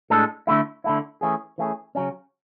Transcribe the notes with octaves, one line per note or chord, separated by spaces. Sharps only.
A2 G#3 D4 A4
D3 A3 E4
D3 A3 E4
E3 A3 C#4 G#4
E3 A3 C#4 G#4
C#3 F#3 C#4